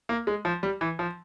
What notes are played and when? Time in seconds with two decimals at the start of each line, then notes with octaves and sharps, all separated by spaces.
0.09 A#3
0.27 G#3
0.45 F3
0.63 G3
0.81 E3
0.99 F3